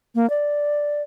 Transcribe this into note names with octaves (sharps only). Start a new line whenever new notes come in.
A#3
D5